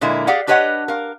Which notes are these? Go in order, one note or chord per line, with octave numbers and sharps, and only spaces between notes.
A#2 D3 G#3 A#3 E4
G4 G#4 D5 F5 F#5
D4 G4 B4 C#5 D#5 F#5
A#4 F5